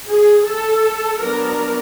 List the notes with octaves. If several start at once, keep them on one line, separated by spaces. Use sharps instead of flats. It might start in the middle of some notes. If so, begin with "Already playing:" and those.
G#4
A4
F#3 B3 D4 A#4